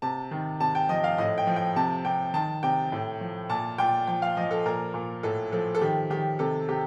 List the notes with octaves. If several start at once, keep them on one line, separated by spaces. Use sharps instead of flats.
C3 A5
D#3
C3 A5
G5
F3 D#5
F5
A2 D#5
G5
F3
G5
C3 A5
C3 G5
D#3 A5
C3 G5
A2
F3
A#2 A5
A#2 G5
F3 G5
F5
F3 D#5
A4
A#2 A#4
A#2
A2 A4
F3 A4
A4
D#3 G4
D#3 G4
C3 A4
C3 G4